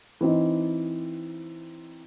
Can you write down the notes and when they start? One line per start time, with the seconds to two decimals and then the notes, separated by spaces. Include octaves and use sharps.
0.21 E3 C4 D#4